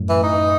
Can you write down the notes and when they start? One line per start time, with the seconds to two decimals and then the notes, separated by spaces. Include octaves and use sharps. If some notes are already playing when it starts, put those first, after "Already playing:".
Already playing: F#2 A2
0.09 E3
0.23 D#4